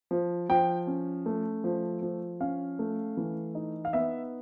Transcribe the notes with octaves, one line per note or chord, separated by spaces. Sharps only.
F3
F3 G5
C#4
A3
F3
F3
C#4 F5
A3
E3
D#4
F5
B3 E5